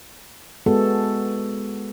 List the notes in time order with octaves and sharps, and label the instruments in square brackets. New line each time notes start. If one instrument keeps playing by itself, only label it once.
[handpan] G#3 B3 F#4 A4